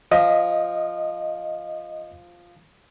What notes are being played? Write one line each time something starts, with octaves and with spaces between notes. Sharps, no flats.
F3 D#5